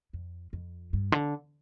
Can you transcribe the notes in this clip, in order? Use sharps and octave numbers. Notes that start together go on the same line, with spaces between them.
F2
F2
G2
D3